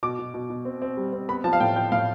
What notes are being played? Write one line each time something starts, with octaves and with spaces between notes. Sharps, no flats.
B2 D6
B2
B2
B2
C4
C4
G3
C4
B3 B5
F3 A5
F5
A2 G5
F3 G5
A2 F5